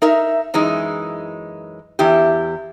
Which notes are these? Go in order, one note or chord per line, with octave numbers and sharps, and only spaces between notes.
D#4 A#4 E5
F#2 E3 G#3 D#4
E2 E4 G4